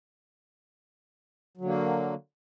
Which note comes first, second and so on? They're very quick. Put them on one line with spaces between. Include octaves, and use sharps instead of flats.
F#3 D3 A#3